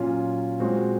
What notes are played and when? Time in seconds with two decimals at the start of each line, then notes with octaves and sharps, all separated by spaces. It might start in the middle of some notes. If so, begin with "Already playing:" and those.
Already playing: A#2 F#3 C#4 F4
0.60 A#2 G#3 C4 F#4